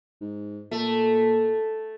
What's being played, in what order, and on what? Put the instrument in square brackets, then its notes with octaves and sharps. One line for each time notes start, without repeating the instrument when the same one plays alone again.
[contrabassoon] G#2
[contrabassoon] A#2 [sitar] A3